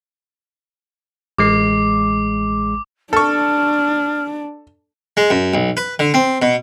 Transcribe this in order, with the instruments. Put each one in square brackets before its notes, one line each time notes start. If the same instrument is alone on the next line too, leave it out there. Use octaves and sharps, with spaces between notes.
[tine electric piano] A1 G#3 C7 [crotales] D6
[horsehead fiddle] D4 [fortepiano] A4 C#6 [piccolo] F6
[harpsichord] G#3
F#2
B1
B4
D3
C4
B2